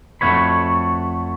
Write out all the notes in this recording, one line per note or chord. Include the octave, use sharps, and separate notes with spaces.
F2 A3 F#4 C#5 B5